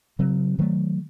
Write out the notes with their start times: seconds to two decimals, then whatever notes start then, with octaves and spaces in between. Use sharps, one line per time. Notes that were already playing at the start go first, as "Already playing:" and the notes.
0.19 C#3 F#3 C4
0.59 D#3 F#3 A3